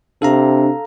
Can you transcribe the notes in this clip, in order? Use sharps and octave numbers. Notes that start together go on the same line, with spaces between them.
C3 D4 A4 F5 A#5